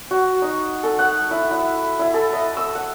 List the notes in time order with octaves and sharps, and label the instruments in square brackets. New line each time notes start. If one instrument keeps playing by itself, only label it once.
[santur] F#4
D#4
A4
F#5
E4
E4
E4
A4
D#5
E6
F#5